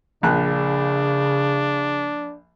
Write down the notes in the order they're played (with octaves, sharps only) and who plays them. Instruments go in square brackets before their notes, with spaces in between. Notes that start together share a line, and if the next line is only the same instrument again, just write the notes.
[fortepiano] A#1 A5 F#6 [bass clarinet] C#3 [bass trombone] D4